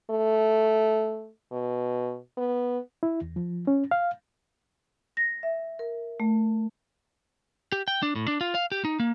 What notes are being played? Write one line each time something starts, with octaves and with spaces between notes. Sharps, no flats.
A3
B2
B3
E4
E2
F3
C#4
F5
A#6
E5
A#4
A3
G4
G5
D4
A2
D4
F4
F5
G4
D#4
A#3